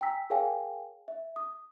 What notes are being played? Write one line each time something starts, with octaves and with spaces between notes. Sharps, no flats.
G5 G#5 A#5 E6 B6
G#4 A#4 C#5 F5 G5 G#5
E5
D#6